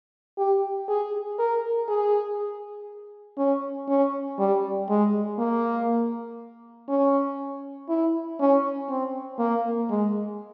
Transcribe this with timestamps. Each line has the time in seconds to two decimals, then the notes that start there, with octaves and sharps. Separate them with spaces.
0.38 G4
0.88 G#4
1.39 A#4
1.88 G#4
3.38 C#4
3.88 C#4
4.39 G3
4.89 G#3
5.38 A#3
6.89 C#4
7.89 E4
8.40 C#4
8.89 C4
9.39 A#3
9.90 G#3